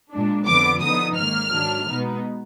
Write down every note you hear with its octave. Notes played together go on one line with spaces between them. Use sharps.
A#2 G#3 D4
F2 D3 F3 B3 D6
D3 F3 B3 D#4 D#6
G#2 D#3 A#3 F6
G#2 D#3 F#3 D4
B2 G#3 B3 D#4